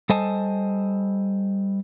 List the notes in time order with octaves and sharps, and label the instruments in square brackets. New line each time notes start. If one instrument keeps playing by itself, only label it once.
[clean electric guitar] G3 A4 C5 D#5 G#5 A5